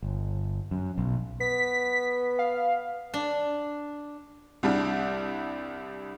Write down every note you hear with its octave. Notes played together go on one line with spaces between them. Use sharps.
G1
F#2
B1
B3 B6
F5
D4
C2 G3 D4